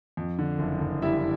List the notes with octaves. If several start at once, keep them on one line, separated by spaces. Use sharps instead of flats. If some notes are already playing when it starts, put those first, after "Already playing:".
F2
D3
F#1
F#1
G3 E4 E5